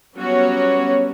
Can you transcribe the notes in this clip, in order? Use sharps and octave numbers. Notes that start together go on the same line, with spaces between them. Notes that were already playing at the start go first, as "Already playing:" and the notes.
F#3 G3 B3 C#4 F#4 C#5